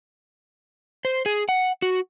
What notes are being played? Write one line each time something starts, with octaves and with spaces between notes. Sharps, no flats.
C5
G#4
F#5
F#4